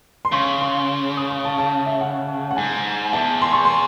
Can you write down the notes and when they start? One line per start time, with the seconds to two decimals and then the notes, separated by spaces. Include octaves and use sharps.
0.25 C6
0.32 C#3 C#6
0.61 C6
1.17 D#6
1.30 C#6
1.45 A5
1.58 A5
1.86 E5
2.01 F#5
2.51 F#5
2.56 G#2 G#5
3.13 E2 A5
3.42 C6
3.53 C#6
3.65 C6